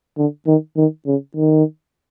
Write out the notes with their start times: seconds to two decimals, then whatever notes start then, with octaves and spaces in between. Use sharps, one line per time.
0.18 D3
0.47 D#3
0.77 D#3
1.07 C#3
1.37 D#3